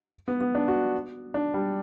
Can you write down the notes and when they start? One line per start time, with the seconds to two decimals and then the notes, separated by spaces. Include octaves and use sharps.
0.28 B3
0.41 B3
0.55 D4
0.68 F#4
1.34 D4
1.54 G3